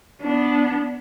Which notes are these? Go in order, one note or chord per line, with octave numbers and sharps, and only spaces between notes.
B3 D4